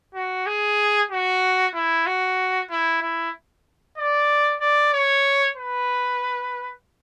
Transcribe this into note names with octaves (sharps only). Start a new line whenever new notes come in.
F#4
G#4
F#4
E4
F#4
E4
E4
D5
D5
C#5
B4